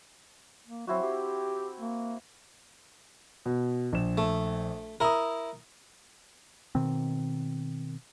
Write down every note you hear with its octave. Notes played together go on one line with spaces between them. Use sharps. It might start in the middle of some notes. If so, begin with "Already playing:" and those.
A#3
F#3 C4 E4 F#4
G4
A#3
B2
A#1 E7
A3
E4 A#4 A#5 D#6
B2 D#3 C4